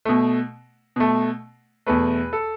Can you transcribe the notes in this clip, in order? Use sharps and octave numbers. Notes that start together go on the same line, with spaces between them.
B2 A3
B2 A3
E2 B2 A3 B4
A4